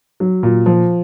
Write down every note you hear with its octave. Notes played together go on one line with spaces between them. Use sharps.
F#3
A#2
F3